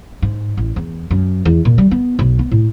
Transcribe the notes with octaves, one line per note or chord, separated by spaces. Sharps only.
G#2
A1
E2
F#2
E2
A#2
G3
B3
B1
B3
A2